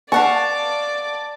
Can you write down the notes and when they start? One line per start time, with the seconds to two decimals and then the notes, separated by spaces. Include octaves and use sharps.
0.12 D5 F5 F#5 A5 C#6